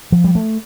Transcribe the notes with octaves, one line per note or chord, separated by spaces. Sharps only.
F3
G3
A3